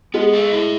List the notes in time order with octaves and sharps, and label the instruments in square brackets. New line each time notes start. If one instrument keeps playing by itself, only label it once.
[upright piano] G#3 [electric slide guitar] B3
[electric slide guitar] A4
E4